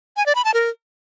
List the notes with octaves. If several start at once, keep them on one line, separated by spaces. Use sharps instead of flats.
G#5
D5
B5
A5
A#4